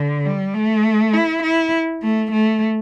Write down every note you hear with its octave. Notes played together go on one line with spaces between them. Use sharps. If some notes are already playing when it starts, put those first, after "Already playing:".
Already playing: D3
G3
A3
E4
E4
A3
A3